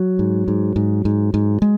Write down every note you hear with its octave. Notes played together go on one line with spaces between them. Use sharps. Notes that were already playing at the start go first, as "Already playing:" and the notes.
Already playing: F#3
G#2
G#2
G#2
G#2
G#2
G#3